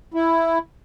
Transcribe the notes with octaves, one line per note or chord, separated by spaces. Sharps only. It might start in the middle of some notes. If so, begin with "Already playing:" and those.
E4